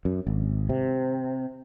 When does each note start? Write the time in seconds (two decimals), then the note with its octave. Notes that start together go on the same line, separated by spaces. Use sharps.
0.05 F#2
0.27 G#1
0.69 C3